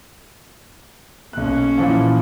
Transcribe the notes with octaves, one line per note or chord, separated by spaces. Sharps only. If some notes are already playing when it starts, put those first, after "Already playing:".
B1 A#3 C#4 F#6
A#2 E3 F3